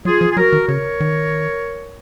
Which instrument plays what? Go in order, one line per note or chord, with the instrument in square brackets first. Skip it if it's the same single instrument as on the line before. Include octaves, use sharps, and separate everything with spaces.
[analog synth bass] F#3 [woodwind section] F4 G#4
[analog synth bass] F3
[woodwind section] G#4
[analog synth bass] F#3 [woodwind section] F#4 A#4
[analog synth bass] D#3
[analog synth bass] C#3 [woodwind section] A#4 C#5
[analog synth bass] D#3